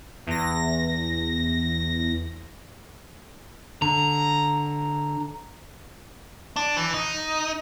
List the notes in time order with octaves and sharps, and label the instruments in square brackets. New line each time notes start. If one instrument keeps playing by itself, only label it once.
[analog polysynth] E2 A#6
[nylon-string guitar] D3 [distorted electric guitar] A#5
[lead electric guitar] D4
E3
D#4